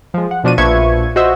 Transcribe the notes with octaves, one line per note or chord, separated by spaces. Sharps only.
F3 G#3
F#5
B2 F3 D4 F#4 D#7
A#1 F3 B4 E5 C#6 G#6
F#4 C5 D#5 E5